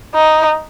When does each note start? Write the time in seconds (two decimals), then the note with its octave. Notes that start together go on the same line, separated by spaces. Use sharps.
0.15 D#4